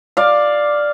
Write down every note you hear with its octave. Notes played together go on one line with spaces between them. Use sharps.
D5 F5